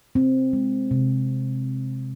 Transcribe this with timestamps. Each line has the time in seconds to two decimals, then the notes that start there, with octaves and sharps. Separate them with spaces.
0.15 C4
0.53 G#3
0.91 C3